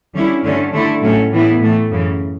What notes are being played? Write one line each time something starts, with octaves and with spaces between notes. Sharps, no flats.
D3 G3 C#4 E4
G2 D3 A3 C#4
D3 A3 E4
A2 F#3 A3 C#4
A2 E3 B3 E4
A2 E3 A3
F#2 C#3 E3